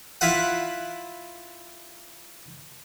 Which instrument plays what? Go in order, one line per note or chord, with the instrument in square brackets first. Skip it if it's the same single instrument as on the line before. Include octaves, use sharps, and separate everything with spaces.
[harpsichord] E4 F4 B4 F#5